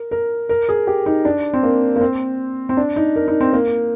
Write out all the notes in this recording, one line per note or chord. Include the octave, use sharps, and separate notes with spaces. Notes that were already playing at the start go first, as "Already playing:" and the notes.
Already playing: A#4
A#4
A#4
G#4
G4
D#4
D4
C4
A#3
A#3
C4
C4
D4
D#4
A#4
D#4
C4
A#3